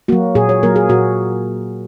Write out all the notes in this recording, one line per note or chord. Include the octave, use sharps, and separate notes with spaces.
F#3 A#3 F#4
A#2 G#4
C#5
F#3 A#3 A#4
G#4
A#2 F#4